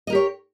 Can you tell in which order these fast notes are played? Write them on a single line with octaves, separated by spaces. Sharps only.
D#5 A#4 G4 C#5